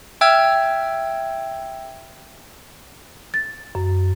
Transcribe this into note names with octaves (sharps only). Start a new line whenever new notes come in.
E5 G5 E6 F6 G#6
A6
F#2